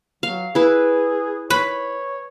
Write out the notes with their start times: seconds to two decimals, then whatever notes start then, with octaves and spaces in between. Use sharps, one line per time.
0.23 F#3 F5
0.55 E4 G#4 B4
1.50 B4 C#5 B5